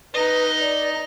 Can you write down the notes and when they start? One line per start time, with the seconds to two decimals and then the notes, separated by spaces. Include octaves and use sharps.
0.14 D#4 B4 D#5
0.61 D5